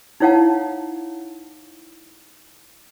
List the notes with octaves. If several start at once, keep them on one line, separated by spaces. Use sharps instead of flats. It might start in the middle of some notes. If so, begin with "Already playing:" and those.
D#4 E4 C#5 F5 F#5 A5